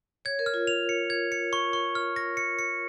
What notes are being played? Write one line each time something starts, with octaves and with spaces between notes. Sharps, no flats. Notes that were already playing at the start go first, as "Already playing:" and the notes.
C#5 G#6
A#4
F6
F4
F7
C#7
G#6
C#7
C#6
C#6
F6
A#6
C#7
C#7